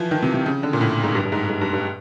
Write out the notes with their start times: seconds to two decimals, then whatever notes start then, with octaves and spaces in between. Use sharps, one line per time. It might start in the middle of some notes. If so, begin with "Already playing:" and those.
Already playing: E3 F3
0.11 D#3
0.22 C3
0.34 C3
0.46 C#3
0.63 D3
0.73 A#2
0.81 A2
1.04 G#2
1.15 G2
1.25 G2
1.32 G#2
1.49 G#2
1.61 G2
1.73 G2